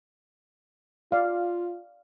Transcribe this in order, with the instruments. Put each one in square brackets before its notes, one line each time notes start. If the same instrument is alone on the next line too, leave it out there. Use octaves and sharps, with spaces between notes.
[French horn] F4 [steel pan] D5 F5